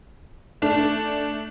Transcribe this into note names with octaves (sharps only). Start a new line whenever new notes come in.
A3 D4